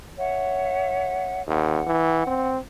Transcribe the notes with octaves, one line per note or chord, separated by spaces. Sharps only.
C#5 E5 F#5
D#2 F#5
E3
C4